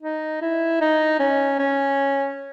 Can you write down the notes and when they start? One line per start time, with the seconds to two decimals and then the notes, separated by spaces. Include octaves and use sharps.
0.02 D#4
0.42 E4
0.81 D#4
1.20 C#4
1.59 C#4